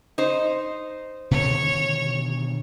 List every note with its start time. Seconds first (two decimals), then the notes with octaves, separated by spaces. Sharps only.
0.18 D#4 C5
1.31 B2 D3 D#3 C#5